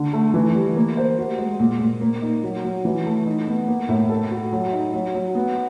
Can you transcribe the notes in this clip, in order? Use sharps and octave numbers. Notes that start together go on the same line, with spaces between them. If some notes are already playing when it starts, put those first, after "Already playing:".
Already playing: D3
A3
E3
G3
A#3
C5
F#4
G#3
A#2
A#2
A#3
D#4
F#3
F#3
E3
A3
D#4
B3
A#3
A2
A4
F#4
F#3
D#4
F#3
F#3
B3